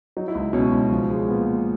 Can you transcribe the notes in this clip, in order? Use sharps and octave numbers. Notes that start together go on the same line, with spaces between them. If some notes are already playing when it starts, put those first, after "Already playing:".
F#3 D#4
E4
C#2
B2 C#4
C#2
F3
G#3
A#2 B3